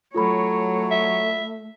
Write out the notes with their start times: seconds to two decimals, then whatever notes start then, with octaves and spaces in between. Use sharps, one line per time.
0.15 F#3 A3 F4 A4 C#5 B5
0.91 E5